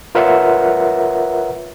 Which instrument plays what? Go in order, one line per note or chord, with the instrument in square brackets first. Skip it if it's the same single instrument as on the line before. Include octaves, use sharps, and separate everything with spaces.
[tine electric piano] F4 A#4 B4 C#5 E5 F#5